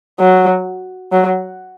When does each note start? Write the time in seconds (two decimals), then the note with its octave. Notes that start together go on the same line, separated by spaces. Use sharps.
0.20 F#3
1.12 F#3